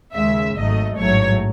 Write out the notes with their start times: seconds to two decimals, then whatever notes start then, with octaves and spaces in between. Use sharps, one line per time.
0.14 D#2 C#3 G#3 E5
0.56 G#1 G#2 F#3 A3 D#5
0.98 A1 G#2 F#3 A3 C#5